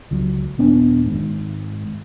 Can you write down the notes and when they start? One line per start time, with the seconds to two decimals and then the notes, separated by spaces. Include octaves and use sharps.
0.11 C#2 F#3
0.58 D#1 B3 D4
1.06 G#1 G#2